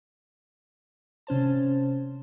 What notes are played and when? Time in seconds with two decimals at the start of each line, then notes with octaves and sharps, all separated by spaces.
1.27 C3 C#4 C5 A5